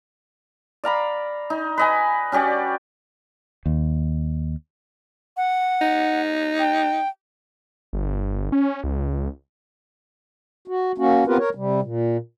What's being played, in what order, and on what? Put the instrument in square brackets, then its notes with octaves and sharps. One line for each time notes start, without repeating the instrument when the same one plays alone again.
[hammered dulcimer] D5 F5 A#5 B5
D#4
B4 D#5 G#5
C#4 F#4 G4 D5
[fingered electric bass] D#2
[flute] F#5
[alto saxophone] D#4
[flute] G5
[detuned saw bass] G1
C#4
C#2
[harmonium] F#4
A#3 C#4 F#4
B3 C4 F4 G4 A#4 B4
A#4 C#5
C3 G3
A#2